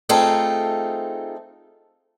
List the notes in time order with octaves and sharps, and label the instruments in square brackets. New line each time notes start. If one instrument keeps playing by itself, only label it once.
[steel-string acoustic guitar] A3 C4 D#4 F4 G#4 A4